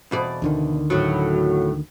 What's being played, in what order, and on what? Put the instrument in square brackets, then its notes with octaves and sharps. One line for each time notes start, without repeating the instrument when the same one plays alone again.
[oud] E2 B2 D5
[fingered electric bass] D2 D3 D#3
[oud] A2 F#3